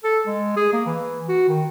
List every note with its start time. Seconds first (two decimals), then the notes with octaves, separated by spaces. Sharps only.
0.04 A4
0.27 G#3
0.56 G#4
0.73 A#3
0.86 E3
1.29 F#4
1.49 D#3